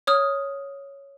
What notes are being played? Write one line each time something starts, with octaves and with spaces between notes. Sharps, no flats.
C#5 D#6 F6